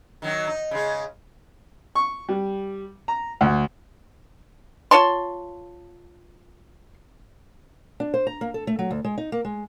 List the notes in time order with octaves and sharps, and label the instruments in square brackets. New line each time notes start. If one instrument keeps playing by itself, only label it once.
[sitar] D#3 F#3 D#4
D#4
C#3 G#3
[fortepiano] C#6
G3
A#5
D2
[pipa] F4 C#5 A5 C6
[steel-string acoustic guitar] D4
C5
A#5
A#3
A4
A3
F#3
D2
G#3
D#4
A#3
G#3